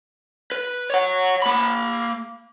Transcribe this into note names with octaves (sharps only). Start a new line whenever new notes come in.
B4
C#5 F#5
A#3 B5